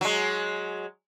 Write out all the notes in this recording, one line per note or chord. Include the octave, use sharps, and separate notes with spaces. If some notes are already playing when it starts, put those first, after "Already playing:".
F#3 G#3